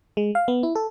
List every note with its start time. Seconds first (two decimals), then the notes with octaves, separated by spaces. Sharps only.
0.17 G#3
0.35 F5
0.48 B3
0.63 E4
0.75 A4